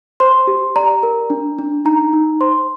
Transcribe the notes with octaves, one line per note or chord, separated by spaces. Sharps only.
C5 C6
G4
D5 A#5
A#4
D4
D4
D#4 A#5
D#4
C5 C6